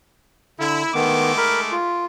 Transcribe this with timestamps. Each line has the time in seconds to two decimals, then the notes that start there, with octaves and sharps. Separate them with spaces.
0.60 D3 E4
0.94 D#3 G#3 A3 B3 D6
1.37 A#4 B5
1.72 F4